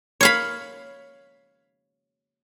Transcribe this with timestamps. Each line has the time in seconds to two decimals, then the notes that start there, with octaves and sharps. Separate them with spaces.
0.21 C#5 F5 B5